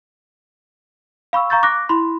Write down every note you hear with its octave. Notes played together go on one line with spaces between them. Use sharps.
F5 B5 C#6 E6
F5 A#5 C#6 G6 A6
D6 F#6 A#6
E4 B5 C6